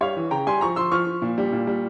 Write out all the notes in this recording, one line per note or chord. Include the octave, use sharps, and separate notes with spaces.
G3 C#5 F5
E3
C#3 G5 A#5
G3 G#5 C6
F3 A#5 C#6
F3 C6 E6
F3 C#6 F6
F3
A#2
G3
A#2
G3